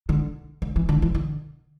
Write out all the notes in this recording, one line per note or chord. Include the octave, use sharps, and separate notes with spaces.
D3
D3
E3
D3
E3
D3